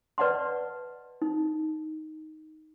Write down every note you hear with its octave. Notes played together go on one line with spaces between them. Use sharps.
B4 D5 D#5 F#5 A5 C6
D#4